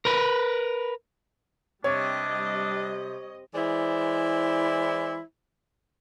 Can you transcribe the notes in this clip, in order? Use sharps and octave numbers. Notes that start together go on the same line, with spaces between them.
A#4 B4
C3 G3 D4 C#5 D#5
E3 G#3 E4 C5 D5